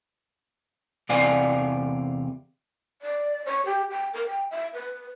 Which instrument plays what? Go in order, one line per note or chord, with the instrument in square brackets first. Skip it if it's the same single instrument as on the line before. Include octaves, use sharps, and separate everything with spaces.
[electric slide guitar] E2 C3 E3 D5 F5 G#5
[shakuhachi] D5
C#5
G4
G5
A#4
G5
E5
B4